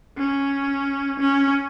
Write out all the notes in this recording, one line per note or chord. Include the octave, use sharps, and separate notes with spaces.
C#4
C#4